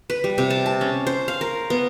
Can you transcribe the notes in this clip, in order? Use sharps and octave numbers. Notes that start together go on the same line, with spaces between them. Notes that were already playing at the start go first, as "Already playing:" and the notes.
B4
G3
C3
A5
A5
C#4
C5
F5
A#4
B3